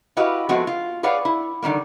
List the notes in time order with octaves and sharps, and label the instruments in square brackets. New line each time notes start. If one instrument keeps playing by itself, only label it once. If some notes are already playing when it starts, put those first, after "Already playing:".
[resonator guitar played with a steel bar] E4 F#4 G4 B4 D#5 F5
F3 G#3 A3 B3 C4 F#4
F4
G#4 B4 C#5 D5 F5 F#5
E4
D3 D#3 G3 A#3